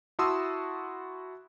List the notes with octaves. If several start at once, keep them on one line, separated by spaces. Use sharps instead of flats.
E4 F#4 A5 C6 D#6 E6